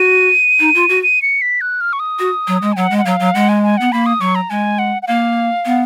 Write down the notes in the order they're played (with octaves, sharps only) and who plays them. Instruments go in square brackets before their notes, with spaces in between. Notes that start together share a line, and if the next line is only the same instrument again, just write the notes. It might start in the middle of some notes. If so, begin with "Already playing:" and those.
Already playing: [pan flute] F#4 [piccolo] D#7
[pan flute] D#4
F4
F#4
[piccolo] D#7
C#7
B6
F#6
F6
C#6
D#6
[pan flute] F#4
F#3
G#3
[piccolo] G#5
[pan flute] F#3 [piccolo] F#5
[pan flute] G#3
[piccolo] F#5
[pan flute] F#3 [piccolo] F5
[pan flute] F#3
[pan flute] G#3 [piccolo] F#5
[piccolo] G#5
G#5
[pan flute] B3 [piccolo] F#5
[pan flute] A#3 [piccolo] B5
[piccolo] D#6
[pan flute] F#3 [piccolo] C#6
[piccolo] A#5
[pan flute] G#3 [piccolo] G#5
[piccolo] F#5
F#5
[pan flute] A#3 [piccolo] F5
[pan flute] B3